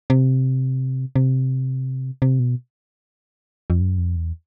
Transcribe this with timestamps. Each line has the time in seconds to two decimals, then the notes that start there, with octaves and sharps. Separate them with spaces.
0.10 C3
1.16 C3
2.22 C3
2.39 B2
3.70 F2
3.81 F#2
3.98 F2
4.16 E2